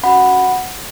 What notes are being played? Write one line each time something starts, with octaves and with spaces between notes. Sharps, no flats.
C#4 F#4 F#5 B5